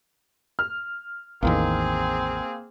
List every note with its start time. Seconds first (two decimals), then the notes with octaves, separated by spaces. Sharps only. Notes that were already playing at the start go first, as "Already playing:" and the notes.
0.59 F6
1.43 A1 E2 D#3 A#3 C4 G#4